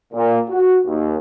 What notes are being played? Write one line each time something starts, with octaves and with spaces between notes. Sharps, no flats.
A#2
F#4
D#2